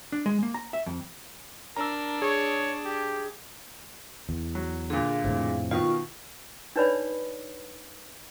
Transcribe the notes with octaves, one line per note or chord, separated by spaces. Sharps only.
D4
G#3
A#3
A#5
E5
F2
D4 A#4 A#5 E6
G#4 C#5
G4
E2
F#3
A#2 D3 G#4 F5
F2 A2 C3
B2 D#3 F4 F5 C#6
D4 D#4 B4 C#5 D5 B5